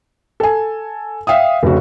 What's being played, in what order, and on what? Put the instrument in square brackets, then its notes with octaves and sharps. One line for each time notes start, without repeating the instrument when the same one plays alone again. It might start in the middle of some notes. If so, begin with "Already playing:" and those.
[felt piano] A4 G#5
E5 F5 G5 D#6
F1 C#3 F#4